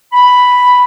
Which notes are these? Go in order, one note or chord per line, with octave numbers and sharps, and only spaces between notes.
B5